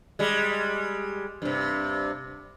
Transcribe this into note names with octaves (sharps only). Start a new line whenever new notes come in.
G3 G#3
G2 C3